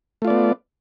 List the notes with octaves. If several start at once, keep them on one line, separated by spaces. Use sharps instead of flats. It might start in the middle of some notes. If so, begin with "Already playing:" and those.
A3 B3 F4 D5